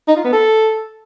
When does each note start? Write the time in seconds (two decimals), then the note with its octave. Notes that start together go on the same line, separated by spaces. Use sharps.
0.08 D#4
0.16 F4
0.24 B3
0.33 A4